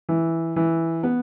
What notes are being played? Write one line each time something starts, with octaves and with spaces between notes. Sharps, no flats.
E3
E3
B3